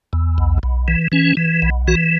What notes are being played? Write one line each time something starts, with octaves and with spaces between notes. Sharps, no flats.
E2
B1
B1
E3
E3 C#4
E3
B1
E3 F#4